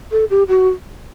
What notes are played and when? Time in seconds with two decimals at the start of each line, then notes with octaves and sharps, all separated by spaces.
0.12 A4
0.30 G4
0.48 F#4